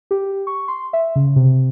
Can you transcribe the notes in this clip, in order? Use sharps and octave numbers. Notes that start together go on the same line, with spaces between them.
G4
C#6
C6
E5
C#3
C3